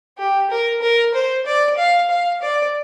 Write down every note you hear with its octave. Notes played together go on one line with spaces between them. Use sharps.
G4
A#4
A#4
C5
D5
F5
F5
D5